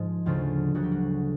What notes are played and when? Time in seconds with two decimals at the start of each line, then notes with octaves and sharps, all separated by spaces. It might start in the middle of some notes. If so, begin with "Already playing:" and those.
Already playing: G#2 F3 G#3
0.26 D2 C#3 F3 F4
0.74 D2 C#3 F#3 F#4
0.83 G4
0.92 F#4